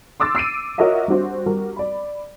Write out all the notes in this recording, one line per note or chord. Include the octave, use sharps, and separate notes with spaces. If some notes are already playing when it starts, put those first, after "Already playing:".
C6 D6 E6 A6
E6 C7 D7 D#7
F4 F#4 A#4 C#5 D#5 E5
G3 D4 F#4 C5
G3 F#4 A#4
D5 B5